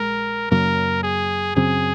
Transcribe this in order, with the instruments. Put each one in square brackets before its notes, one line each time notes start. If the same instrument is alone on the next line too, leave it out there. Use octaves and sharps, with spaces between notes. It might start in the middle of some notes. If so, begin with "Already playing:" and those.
Already playing: [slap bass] A#1 G#3 [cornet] A#4
[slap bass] F#2 C#3 F#3 A#3 [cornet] A#4
[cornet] G#4
[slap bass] F#2 C#3 F#3 C4 [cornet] G#4